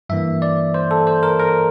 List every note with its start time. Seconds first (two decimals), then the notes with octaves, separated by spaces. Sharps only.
0.09 G2 E3 A#3 E5
0.42 D5
0.74 C5
0.91 A4
1.07 C5
1.23 A#4
1.40 A#4